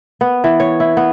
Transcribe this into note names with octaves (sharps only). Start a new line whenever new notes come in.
B3
E3
C#5
E4
B3